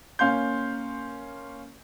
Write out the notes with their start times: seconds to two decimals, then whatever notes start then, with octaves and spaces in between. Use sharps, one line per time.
0.19 A#3 C#4 F5 C6 G6